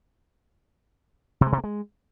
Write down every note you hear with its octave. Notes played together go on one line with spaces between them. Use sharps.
C3
G#3
C3
A#3
G#3